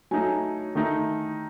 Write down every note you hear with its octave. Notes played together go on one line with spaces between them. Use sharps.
F#3 A3 D#4 G#5
D#3 A3 D#4